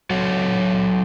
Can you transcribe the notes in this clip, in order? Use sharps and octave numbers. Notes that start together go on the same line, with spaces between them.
F#3 F#4 A4 C#5